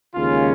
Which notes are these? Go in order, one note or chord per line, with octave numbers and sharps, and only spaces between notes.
D#2 C#3 G#3 C#4 F4